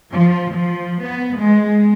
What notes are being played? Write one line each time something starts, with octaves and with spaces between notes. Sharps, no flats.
F3
F3
B3
G#3